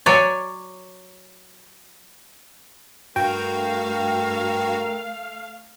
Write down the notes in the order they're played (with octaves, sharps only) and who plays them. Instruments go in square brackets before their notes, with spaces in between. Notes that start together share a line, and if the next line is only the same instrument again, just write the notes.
[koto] F#3 C#5 D5 G#5
[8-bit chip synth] G2 F#4 [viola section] A3 F5 [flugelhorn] A#4 [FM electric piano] G5